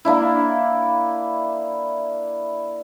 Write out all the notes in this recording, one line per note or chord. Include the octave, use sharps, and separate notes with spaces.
A#3 D4 E4